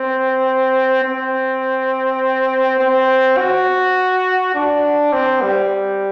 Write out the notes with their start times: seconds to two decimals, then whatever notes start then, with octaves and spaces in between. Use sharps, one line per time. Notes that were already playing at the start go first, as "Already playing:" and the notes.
Already playing: C4
1.03 C4
2.79 C4
3.37 F#4
4.55 D4
5.13 C4
5.42 G3